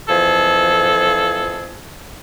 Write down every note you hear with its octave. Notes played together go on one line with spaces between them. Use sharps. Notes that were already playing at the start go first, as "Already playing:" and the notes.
F2 E3 F3 G#4 A4